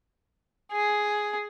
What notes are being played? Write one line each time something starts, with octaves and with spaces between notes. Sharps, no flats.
G#4